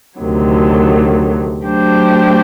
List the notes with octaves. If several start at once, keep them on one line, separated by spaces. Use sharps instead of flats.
D2 C3 D#3 F#3
F#3 A3 D4 G4 C5